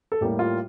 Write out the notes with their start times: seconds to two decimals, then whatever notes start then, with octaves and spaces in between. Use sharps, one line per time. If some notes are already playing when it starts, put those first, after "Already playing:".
0.12 A4
0.21 A2 G3 A#3 G4
0.39 F4